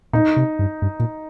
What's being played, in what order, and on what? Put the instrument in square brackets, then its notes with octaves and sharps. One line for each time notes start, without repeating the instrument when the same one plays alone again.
[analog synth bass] A#2 [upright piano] D#4
[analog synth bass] C3
G2
G2
A#2